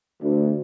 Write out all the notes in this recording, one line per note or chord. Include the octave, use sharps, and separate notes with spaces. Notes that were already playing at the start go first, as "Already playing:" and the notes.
D2